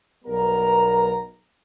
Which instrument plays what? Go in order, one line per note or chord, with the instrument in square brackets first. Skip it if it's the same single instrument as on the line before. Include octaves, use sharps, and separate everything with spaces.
[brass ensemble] B1 G3 B3 A#4 A#5